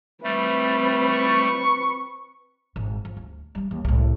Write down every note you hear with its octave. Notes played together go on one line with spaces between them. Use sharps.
G3 A3 C4 B4
C#6
G#1 G#2
F3
D2
G3 G#3
D#2
C2 A2